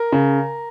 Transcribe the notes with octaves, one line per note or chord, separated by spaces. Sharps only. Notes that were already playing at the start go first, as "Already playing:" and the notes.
Already playing: A#4
C#3